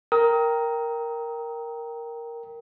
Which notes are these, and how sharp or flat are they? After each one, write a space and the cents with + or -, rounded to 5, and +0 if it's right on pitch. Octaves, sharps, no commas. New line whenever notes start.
A#4 +0 G5 +0 D#6 +35